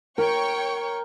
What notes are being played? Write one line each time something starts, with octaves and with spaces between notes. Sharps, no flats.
A#4 C#5 G5 C#6